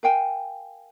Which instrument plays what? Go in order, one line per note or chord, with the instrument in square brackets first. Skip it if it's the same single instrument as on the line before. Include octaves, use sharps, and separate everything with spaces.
[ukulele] A#4 F5 G5 G#5